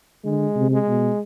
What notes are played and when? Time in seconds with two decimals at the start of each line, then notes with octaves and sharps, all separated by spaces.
0.25 D3 G#3
0.56 C3
0.71 G#3
0.88 B2